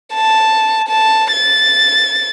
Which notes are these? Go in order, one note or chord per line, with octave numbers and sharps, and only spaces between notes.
A5
A5
A6